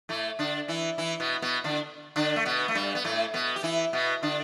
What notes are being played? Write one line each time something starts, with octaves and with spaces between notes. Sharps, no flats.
A2 A3
D3 D4
E3 E4
E3 E4
B2 B3
B2 B3
D3 D4
D3 D4
A3
B2 B3
A3
G2 G3
B3
A2 A3
B2 B3
G4
E3 E4
B2 B3
D3 D4